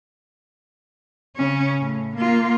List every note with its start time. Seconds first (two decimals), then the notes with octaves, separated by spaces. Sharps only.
1.37 C#3 C#4
1.80 A2
2.17 A#3 F4